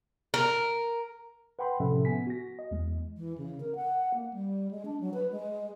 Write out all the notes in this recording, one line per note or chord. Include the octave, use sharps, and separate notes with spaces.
A#4
B4 F#5 G5 B5 C6
A2 C3 F3 C#4 A4 E5
B3 G#5 B6
F#4 A#6
D#5
E2 G#3
E3
C#3
A#4
F#5
A#3
G3
G#3
D4
F#3
B4
G#3